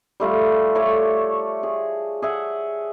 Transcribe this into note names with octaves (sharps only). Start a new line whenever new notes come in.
G3 A3 F4 G4
A3 C#5 D5
G#4
G#4 E5 F#5